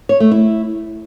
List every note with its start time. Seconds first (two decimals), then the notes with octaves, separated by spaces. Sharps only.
0.09 C#5
0.20 A3
0.31 E4